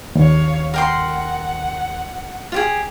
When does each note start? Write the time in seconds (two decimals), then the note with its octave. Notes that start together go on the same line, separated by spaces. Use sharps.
0.15 D#2 C#5 F5
0.74 A#4 F#5 G5 C6
2.52 F4 G4 G#4